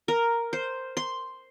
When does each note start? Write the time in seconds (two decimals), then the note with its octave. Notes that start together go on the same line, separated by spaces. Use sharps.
0.08 A#4
0.53 C5
0.97 C6